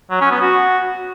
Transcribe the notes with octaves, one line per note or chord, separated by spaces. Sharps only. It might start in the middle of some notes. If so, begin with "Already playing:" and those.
F#3
C#4
B3
F#4